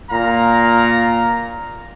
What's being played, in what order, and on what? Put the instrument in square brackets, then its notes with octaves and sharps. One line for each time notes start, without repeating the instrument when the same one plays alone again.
[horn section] A#2 F5 A#5